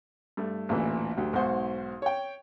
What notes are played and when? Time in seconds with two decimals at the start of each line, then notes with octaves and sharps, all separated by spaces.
0.37 G2 A3
0.69 A1 D2 A#2 E3
1.17 D2 F#3 G4
1.33 B1 G#2 F#4 C5 F#5
2.02 C#5 G5